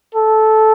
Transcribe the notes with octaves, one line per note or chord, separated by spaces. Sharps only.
A4